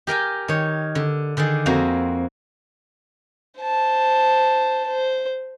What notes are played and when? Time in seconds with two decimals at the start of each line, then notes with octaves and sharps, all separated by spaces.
0.07 G4 A#4 G5 G#5
0.48 D#3 C#5
0.95 D3
1.37 D3 D#3 G#4 D5
1.66 F2 A#3 C4 F#4 E5
3.60 C5 A5
4.88 C5